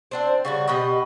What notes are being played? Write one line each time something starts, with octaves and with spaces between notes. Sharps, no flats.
C4 D4 C5
C#3 G3 F#4
B2 G4 B4 D#5